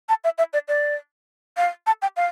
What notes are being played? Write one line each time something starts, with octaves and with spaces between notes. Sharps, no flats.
A5
E5
E5
D5
D5
F5
A5
G5
F5